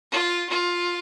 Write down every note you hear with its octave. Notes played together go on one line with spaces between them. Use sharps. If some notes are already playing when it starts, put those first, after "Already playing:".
F4
F4